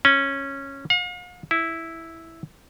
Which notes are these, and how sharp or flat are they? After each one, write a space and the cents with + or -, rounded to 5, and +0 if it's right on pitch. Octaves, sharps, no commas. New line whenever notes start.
C#4 -10
F5 +45
E4 -5